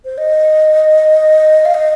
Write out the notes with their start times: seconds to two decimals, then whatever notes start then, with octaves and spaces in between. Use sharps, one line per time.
0.05 C5
0.18 D#5
1.65 F5
1.74 D#5